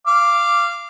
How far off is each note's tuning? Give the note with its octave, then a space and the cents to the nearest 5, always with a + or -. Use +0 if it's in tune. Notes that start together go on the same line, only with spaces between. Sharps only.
F5 -15 D6 +0